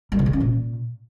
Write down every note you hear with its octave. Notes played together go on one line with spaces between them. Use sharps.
G3
D3
D#3
C#4
A#2